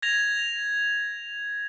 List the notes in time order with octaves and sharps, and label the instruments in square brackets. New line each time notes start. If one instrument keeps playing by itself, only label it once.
[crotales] G#6 A#6 F7